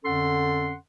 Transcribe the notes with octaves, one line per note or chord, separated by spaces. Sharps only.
F2 D3 C#4 A4 F#5 C6